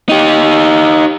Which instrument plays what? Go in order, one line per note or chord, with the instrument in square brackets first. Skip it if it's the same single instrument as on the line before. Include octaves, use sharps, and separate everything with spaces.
[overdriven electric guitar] D#4 G4